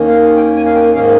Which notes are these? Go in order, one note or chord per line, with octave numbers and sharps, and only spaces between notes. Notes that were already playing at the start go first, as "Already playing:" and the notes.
Already playing: D#2 D#3 A#3 C#4
F5
G5
G#5
F5
G5
G#2 D#3 A#3 C#4 F5